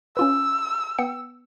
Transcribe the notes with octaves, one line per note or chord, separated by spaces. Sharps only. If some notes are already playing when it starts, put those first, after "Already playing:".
C#4 F4 B4 E6
B3 G5 C#7